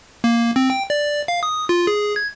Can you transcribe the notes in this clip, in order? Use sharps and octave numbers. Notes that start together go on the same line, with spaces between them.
A#3
C4
G5
D5
F5
D#6
F4
G#4
G#6